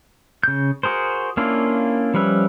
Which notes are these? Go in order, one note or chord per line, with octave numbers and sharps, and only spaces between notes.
C#3 G6
F#4 G#4 A#4 C5
A#3 C#4 D4 E4 F4
F3 G3 C#4 B4 E5